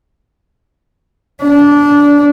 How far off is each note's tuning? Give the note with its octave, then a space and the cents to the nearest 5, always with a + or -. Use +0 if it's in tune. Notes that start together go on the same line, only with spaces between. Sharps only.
D4 -20